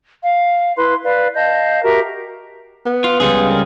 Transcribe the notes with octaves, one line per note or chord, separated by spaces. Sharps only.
F5
E4 B4 C6
B4 D5 F5
D#5 F5 A5 G6
F#4 G4 A#4 E5
B3
F4
C#2 G3 G#4
A#4